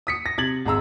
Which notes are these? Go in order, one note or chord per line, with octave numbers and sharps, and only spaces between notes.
D#6 B6 C#7
A#6
C3 G#6 A6 F#7
G#1 G#3 A#5 E6